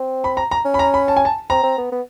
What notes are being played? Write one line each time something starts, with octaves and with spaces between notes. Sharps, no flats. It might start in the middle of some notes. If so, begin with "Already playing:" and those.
Already playing: C4
B5
A#5
A#5
C#4
B5
A#5
B5
A5
G#5
A5
C4 A#5
C4
B3
B3